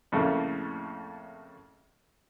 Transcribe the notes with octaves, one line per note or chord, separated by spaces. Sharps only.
F2 A2 C#3 A3 A#3